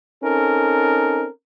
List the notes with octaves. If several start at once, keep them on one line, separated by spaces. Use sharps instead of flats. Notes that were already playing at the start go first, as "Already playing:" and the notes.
C4 C#4 D#4 A4 A#4